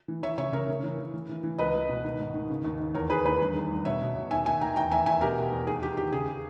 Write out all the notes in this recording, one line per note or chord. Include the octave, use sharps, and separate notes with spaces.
E3
E3 C#5 E5
C#3 C#5 E5
C#3 A#4 C#5
C#3
E3
E3
E3
E3
E3
C#2 B4 D#5
C#2
B2
D#3
G#2
D#3
C#3
D#2
D#2
E2 A#4 C#5
D#3 G#4 B4
E2 G#4 B4
G2
D#3
G2
B2 C#5 E5
B2
B2
D#2 E5 G#5
D#2 E5 G#5
D#2 G5 A#5
E2 G5 A#5
E2 E5 G#5
E2 E5 G#5
B2 G4 A#4
B2
E2
D#2 G#4
D#3 G4
D#2 G4
C#3 G#4